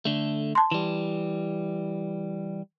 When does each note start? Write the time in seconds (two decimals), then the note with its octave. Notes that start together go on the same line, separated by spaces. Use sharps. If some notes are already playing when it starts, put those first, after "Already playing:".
0.05 D3 A3
0.55 A5 C6
0.72 E3 G3